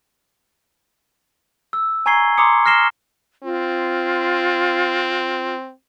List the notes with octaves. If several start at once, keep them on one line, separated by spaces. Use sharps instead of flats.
E6
G#5 A#5 C#6 G#6 C7 G7
A#5 C6 D6 D#6 C#7
F6 A#6 C7 E7 G7
C4 F4